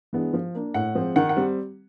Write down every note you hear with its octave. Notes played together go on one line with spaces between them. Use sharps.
E3 G#3 B3 D4
F3
A#3 D4
A2 F#5
F3 G#3 C4
D#3 F#5
F#5
G3 C4